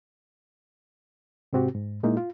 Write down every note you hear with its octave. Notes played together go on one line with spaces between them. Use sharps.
G#2 C3 C4 F#4 G4
G#2
A#2 G#3 A#3 D#4 E4
F4